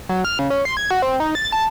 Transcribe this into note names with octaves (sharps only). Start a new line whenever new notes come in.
F#3
F6
C#3
C#4
C6
G#6
F#4
C4
D#4
A6
A5